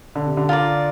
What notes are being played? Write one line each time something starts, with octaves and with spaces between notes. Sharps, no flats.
D3
C3
D3
F4 A#4 D5